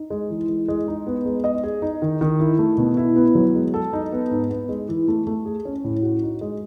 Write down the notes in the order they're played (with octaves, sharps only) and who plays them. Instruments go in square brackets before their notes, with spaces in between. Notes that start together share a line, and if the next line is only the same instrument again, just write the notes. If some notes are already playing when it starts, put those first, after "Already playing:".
Already playing: [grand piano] D#4
G#3
E3
G#3
G#3
D#4
B3
G#3
D#5
G#4
D#4
D#3
D#3
E4
A3
B2
E4
B3
F#3
G#3
A4
D#4
B3
G#2
B3
G#3
E3
A3
A3
G#4
C#4
A2
F#4
D#4
G#3